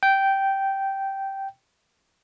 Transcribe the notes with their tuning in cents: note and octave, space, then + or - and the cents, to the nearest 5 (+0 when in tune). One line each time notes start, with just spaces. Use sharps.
G5 -10